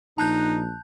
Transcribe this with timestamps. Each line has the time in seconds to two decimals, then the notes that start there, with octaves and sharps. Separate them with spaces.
0.18 A#1 D#4 A5 F#6 G6